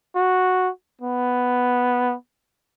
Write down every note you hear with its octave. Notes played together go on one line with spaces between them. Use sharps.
F#4
B3